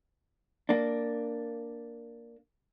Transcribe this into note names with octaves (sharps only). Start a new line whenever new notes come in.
A#3 D4